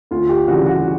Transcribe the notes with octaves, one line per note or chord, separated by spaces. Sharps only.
D2 F4
G4
C#3 E3 G3 F#4
F#4